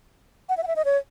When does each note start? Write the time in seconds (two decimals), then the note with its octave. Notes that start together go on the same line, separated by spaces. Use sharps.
0.49 F#5
0.57 E5
0.63 F#5
0.67 E5
0.76 D#5
0.85 C#5